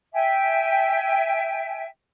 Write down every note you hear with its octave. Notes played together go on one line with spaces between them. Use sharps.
E5 G5 G#5